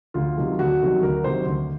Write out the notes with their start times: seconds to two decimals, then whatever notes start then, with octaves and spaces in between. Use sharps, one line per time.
0.14 D2 F4
0.37 C3 D#3 F#3
0.59 D2 F#4
0.81 C3 D#3 F#3
1.03 D2 A#4
1.24 C3 D#3 F#3 C5
1.46 D2